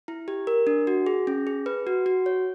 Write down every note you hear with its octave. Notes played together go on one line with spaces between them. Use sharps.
E4
G4
A#4
D4
F#4
G#4
C#4
G#4
B4
F#4
F#4
C#5